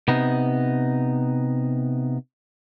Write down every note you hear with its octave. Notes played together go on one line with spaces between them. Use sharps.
C3 B3 D#4